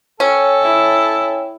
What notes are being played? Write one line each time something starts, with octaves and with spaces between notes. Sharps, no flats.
C#4 A4 C#5 G5
E4